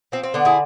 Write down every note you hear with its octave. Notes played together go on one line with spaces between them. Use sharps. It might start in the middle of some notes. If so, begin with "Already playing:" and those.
F3 C4
C4
D3 B3 D4
E4 G#4